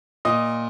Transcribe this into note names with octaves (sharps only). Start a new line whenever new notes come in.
A#2 D#5 D#6